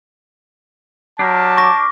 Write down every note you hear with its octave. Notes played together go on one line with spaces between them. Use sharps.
F#3 D4 G4 A#4 A5
C#6 D6 A#6